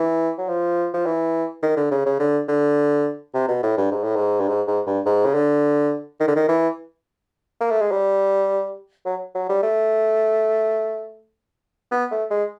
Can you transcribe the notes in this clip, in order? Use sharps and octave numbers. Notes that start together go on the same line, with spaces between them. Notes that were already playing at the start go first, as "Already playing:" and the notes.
Already playing: E3
F#3
F3
F3
E3
D#3
D3
C#3
C#3
D3
D3
C3
B2
A2
G2
G#2
A2
G#2
G2
G#2
G#2
G2
G#2
C#3
D3
D#3
D3
D#3
E3
A#3
A3
G#3
G3
F#3
F#3
G3
A3
B3
A3
G#3